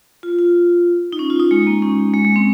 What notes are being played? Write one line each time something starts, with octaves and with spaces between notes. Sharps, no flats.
F4
F4
D#4
C#4
F4
D#4
G#3
A#3
C#4
G#3
G#3
C4